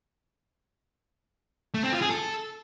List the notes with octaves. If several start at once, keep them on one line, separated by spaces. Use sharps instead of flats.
A3
C4
F4
G#4
A4